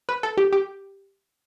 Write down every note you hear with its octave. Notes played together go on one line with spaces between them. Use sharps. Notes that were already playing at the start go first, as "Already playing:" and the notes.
B4
A4
G4
G4